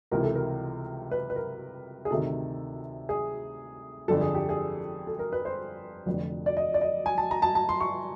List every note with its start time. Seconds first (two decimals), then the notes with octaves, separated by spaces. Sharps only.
0.11 C#2 C3 E3 A#4
0.23 A4
0.35 A#4
1.11 B4
1.30 B4
1.36 A#4
2.05 G#4
2.11 D2 C3 D#3 A4
3.09 G#4
4.08 G1 F2 D3 A4
4.21 G#4
4.35 G4
4.49 G#4
5.07 A4
5.19 A#4
5.32 B4
5.45 C5
6.06 F1 F2 D3
6.46 D5
6.57 D#5
6.74 D5
6.81 D#5
7.06 G#5
7.18 A5
7.31 A#5
7.42 A5
7.55 A5
7.69 C6
7.80 C#6